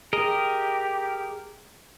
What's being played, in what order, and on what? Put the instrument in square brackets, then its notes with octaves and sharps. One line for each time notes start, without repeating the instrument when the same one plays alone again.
[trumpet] G4 [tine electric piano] G#4 [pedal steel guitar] A#4 D#5